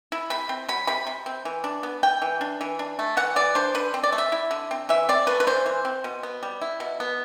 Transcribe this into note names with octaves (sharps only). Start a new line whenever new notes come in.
E4
C3 B5
C4
F#3 B5
C3 B5
C3
C4
E3
D4
B3
E3 G5
E3
D4
E3
D4
A3
E3 F#5
E3 D5
D4 C5
D3 B4
C4
D5
A3
E5
E4
D3
C4
E3 E5
C4 D5
A3 B4
B4
E3 C5
E3
C4
B2
B3
G3
E4
B2
B3